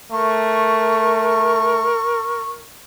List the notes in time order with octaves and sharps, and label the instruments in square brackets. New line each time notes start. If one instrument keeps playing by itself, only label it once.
[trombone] A3 [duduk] A#4 [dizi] C#6